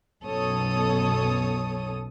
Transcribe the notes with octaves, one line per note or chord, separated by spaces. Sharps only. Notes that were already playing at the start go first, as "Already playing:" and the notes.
B1 F#2 B2 A4 C#5 D#6